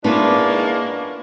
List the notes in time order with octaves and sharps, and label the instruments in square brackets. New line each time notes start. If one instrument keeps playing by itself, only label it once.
[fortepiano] G#2 [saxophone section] E3 G#3 D4 [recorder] A#3 [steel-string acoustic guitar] B3 C#4 F4